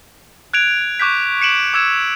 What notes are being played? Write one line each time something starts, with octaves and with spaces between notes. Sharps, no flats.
F#6 G#6 D7 F7
C#6 D6 F#6 G6 B6
C#7 D7 E7 F#7
D6 E6 G#6 E7